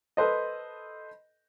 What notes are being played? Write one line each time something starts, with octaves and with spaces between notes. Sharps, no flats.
A4 B4 C5 D#5